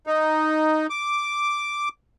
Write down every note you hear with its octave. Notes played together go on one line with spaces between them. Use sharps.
D#4
D6